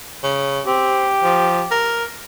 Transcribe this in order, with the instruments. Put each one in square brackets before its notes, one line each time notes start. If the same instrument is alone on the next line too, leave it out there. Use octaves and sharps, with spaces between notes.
[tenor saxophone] C#3
[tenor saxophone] C4 [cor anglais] G4
[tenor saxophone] F3
A#4